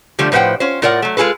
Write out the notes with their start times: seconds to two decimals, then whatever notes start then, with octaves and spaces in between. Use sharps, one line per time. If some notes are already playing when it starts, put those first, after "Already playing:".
0.19 D3 F3 G3 A3
0.32 A2 F3 B4 C5 F#5 G5
0.60 C#4 F4 C5
0.82 A2 F4 A#4 D5 F#5
1.02 F#3 A3
1.17 G#3 F4 G#4 A4 B4